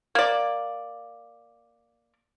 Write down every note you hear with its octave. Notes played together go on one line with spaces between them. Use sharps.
A#3 D5